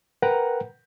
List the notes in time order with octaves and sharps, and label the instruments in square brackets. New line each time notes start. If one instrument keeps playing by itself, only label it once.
[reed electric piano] A#4 B4 F#5 G5 A#5